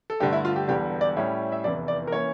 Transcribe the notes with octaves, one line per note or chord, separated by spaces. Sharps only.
A4
G2 D3 A3 G4
E4
F4
G4
E1 E2 D3 G3 G4
D5
A2 G3 C#4 E4
E5
F1 E2 E3 D5
D5
A#4
E3 A#3 C#4 C#5